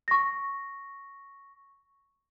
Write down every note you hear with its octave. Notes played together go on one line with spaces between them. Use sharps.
C#6 A#6